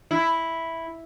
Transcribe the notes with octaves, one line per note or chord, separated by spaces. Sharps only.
E4